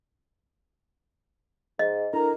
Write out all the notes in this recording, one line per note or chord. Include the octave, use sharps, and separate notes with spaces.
G#2 D#5
D4 E4 A4 A#4 A#5